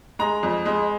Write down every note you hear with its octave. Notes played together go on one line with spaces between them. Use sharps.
G#3 A#5
F2
G#3